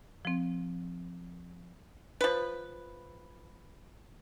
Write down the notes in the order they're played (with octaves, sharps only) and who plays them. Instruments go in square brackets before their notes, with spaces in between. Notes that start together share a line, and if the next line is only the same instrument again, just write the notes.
[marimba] F3 C4
[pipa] F3 B4